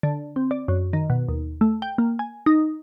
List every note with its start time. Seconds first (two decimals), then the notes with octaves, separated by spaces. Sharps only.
0.03 D3
0.36 C4
0.51 D5
0.68 F#2
0.93 D#3
1.10 B2
1.29 D#2
1.61 A3
1.82 G5
1.98 A#3
2.19 G#5
2.46 D#4